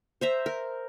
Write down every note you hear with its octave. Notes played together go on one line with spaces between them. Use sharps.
C5 E5 A#5
A#4